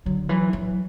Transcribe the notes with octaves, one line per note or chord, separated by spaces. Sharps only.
D3 F#3
E3 F#3
F#3